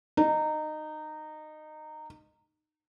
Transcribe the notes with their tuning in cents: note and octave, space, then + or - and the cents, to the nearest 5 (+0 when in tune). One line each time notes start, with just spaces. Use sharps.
D#4 -20